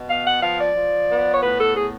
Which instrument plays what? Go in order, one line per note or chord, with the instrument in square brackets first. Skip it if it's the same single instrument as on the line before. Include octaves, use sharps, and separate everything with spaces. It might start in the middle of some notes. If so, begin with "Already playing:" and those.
Already playing: [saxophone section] B2
B3 F5
F#5
F3 F5
D5
F3
B3
C#5
A2 B4
A4
B3 G#4